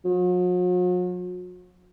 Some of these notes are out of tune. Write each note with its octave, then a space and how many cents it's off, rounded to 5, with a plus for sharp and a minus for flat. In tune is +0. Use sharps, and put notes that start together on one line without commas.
F#3 -45